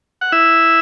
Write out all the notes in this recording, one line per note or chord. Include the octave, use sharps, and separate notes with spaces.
F#5
E4 E5